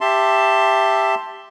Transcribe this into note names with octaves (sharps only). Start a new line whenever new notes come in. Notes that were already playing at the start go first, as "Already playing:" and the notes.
G4 E5 A5 C6